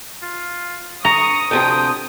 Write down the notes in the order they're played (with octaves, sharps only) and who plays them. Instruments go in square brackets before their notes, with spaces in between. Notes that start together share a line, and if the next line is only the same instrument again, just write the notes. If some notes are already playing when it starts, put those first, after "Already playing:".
[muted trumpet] F4
[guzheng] A#5 [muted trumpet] C#6 [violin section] D#6
[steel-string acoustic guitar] D2 C3 F3 [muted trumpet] G5